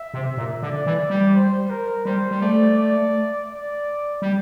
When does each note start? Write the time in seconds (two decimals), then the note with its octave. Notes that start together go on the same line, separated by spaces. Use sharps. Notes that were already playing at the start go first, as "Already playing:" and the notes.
Already playing: E5
0.14 C3
0.37 A#2
0.62 D3 D5
0.86 E3
1.10 G3
1.34 C5
1.70 A#4
2.05 G3 C5
2.31 G3
2.42 A3 D5
2.77 D5
3.50 D5
4.22 G3